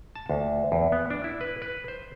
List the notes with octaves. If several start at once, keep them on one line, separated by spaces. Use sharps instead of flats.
A5
D2
E2
B3
D4
E4
B4
B4
C5